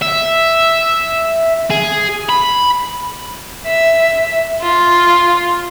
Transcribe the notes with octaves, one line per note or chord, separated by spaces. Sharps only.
E5
G#4
B5
E5
F4